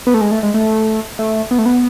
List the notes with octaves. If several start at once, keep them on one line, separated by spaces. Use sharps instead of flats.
B3
A3
G#3
A3
G#3
A3
A3
B3
A3
B3